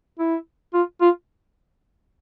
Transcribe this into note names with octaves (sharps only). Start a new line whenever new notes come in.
E4
F4
F4